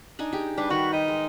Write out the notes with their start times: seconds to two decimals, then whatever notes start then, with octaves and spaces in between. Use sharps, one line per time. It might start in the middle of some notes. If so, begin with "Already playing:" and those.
0.19 D4 D#4 G#5
0.33 G4 G#4
0.57 G3 D4 B4
0.70 D#3 F#4 G4
0.93 D#4
1.08 G#3